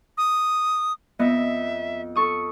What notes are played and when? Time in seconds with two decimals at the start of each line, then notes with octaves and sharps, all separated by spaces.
0.18 D#6
1.19 F2 B3 D#5 E5
2.15 A4 C#6 D#6